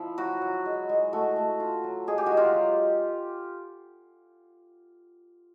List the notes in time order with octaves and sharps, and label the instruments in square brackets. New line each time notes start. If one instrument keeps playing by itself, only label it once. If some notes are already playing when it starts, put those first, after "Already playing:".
Already playing: [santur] F3 E4
F#3 F#4
F#3
G#3
G#3
A3 F#4
A3
F4
F#3
G#3 G#4
G4
F#4
G#3
F4 G4
F#3